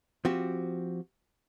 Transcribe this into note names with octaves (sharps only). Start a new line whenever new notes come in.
F3 C4 F#4 G4